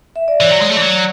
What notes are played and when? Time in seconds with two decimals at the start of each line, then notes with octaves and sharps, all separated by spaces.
0.16 E5
0.28 D5
0.41 E3 C#5
0.51 F#3
0.62 G#3
0.71 A3
0.77 E3
0.81 F#3